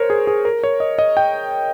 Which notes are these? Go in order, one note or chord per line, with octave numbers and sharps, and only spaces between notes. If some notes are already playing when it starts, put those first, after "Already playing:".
Already playing: A#4 C5 C#5
G#4
G#4
A#4
C#5
D#5
D#5
G5